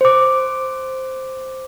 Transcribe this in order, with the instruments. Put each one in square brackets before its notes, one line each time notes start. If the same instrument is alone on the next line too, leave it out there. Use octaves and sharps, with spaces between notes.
[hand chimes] C5 D6